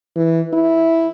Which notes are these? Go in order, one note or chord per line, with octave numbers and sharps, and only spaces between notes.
E3
E4